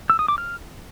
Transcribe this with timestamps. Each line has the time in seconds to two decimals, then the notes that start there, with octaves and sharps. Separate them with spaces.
0.10 E6
0.19 D#6
0.28 D6
0.38 F6